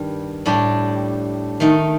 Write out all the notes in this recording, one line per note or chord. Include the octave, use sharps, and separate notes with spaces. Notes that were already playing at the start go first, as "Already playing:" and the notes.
Already playing: G2 D#3 G3
A2 G3 D4 G4
D#3 A3 D#4